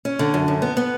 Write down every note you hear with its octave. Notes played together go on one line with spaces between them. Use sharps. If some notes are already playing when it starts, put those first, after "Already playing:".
C#4
D3
F#2
F#2
B3
B3